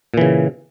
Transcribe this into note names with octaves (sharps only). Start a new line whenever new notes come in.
A#2 C#3 E3